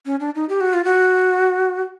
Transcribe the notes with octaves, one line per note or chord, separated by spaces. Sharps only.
C#4
D4
D#4
G4
F#4
F4
F#4